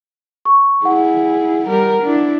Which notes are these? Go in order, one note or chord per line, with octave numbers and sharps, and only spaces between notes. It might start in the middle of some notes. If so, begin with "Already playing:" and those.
C#6
E4 G#4 F#5
G3 A#4
D4 E4